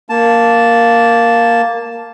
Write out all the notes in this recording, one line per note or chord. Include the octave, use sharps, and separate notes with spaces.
A#3 A5